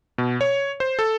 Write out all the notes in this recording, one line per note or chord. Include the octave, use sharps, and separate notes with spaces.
B2
C#5
C5
A4